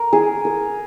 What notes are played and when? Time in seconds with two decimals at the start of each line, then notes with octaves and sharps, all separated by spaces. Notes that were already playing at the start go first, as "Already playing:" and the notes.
Already playing: A#4
0.13 G#4
0.45 A#4